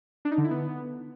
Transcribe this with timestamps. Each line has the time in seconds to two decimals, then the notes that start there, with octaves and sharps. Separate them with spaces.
0.25 D4
0.31 D#4
0.38 D3
0.44 E4
0.51 B3